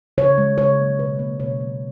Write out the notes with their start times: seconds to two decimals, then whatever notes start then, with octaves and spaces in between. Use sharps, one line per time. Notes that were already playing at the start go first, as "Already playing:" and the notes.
0.18 C#3 C#5
0.38 G#3
0.58 C#3 C#5
0.79 F#3 A#3
0.99 B2 B4
1.19 A#3
1.40 B2 C#5
1.60 F#3 A#3